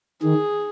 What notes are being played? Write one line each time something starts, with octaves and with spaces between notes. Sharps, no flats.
D#3 G#4